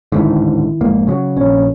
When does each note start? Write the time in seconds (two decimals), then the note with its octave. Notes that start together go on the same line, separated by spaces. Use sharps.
0.12 A1 D2 G#2 D#3 E4
0.81 F1 G#2 A#3
1.07 C#3 F3 F#3
1.37 A#1 C#4 C#5